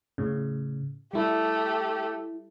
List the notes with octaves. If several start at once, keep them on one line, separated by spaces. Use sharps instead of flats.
A2 C#3
G3 A3 E4 G4